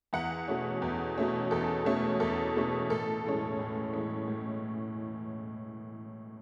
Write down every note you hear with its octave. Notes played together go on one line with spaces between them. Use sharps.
E2 F#5
B2 A3 C#4
E2
B2 A3 C#4
E2 A4
B2 A3 C#4
E2 A4
B2 A3 C#4
A2 A4
E3 G#3 C#4
A2
E3 G#3 C#4
A2